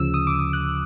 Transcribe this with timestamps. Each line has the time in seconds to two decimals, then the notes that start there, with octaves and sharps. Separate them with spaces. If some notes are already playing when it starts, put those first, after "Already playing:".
Already playing: D2 C#3 F3 E6
0.14 D#6
0.27 D6
0.39 D#6
0.53 F#6